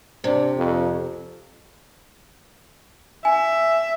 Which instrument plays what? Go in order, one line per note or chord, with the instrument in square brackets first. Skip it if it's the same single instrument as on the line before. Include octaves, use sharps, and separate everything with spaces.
[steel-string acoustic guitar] C3 [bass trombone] D4
[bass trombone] F2
[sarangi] E5 [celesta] G#5